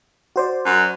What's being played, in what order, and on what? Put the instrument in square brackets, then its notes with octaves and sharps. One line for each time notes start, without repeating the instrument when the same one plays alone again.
[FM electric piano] F#4 C5 D5
[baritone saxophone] F#2